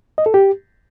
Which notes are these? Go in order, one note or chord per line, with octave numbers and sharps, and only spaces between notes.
D#5
A4
G4